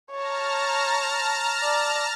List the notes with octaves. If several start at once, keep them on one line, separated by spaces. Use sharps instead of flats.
C#5 A5 A#5 F6
D5